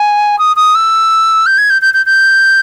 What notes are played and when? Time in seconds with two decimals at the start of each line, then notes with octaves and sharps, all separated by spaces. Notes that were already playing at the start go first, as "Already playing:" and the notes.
Already playing: G#5
0.38 D#6
0.56 D#6
0.75 E6
1.46 G6
1.58 G#6
1.70 G6
1.81 G6
1.93 G6
2.06 G6